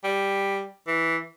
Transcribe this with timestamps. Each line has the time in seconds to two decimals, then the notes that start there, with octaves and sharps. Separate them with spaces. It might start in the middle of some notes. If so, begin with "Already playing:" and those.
0.04 G3
0.87 E3